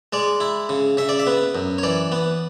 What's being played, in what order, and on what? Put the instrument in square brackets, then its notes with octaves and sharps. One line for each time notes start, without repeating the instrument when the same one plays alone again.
[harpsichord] G#3 D5
E4
C#3
C#3 E5
D5
E5
B3
F#2
C#5
E3 D5
B3